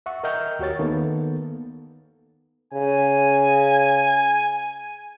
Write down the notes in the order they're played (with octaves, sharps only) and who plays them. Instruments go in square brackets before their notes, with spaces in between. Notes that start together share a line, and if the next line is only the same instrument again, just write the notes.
[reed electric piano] E5 F#5 C#6
A#4 D#5 E5 G5 F6 G6
D#2 F#4 G4 C#5 A6
D#3 A#3 B3 A4
[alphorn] C#3 [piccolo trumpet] G#5